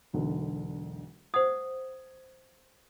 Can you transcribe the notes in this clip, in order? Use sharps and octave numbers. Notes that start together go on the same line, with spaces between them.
E1 B1 D3
C5 F#5 D#6 G#6